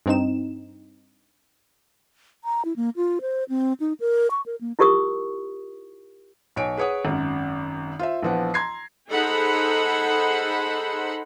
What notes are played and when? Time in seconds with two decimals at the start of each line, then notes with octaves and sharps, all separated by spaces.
0.06 G2 C4 D#4 E7
2.44 A#5
2.65 E4
2.76 A#3
2.96 F4
3.21 C5
3.49 C4
3.80 D#4
4.00 A#4
4.31 C#6
4.46 A#4
4.61 A#3
4.79 E4 F4 G4 A#4 C#6 D#6
6.56 B1 C#5 G#5 D7
6.77 G#4 B4 C#5 F#5 D#6
7.05 G#1 F#2
7.99 F4 C5 E5
8.23 A#1 E3 F3 B3 F#5
8.54 A#5 C6 G#6 C7
9.10 D#4 G#4 A4 C5 F#5 B5